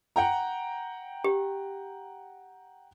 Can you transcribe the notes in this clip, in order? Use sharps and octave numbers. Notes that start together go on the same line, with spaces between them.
F#5 G5 A#5
G4